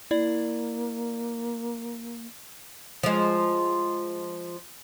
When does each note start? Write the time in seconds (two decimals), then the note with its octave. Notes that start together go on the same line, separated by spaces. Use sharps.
0.11 A#3 E4 D5
3.03 F3 G#3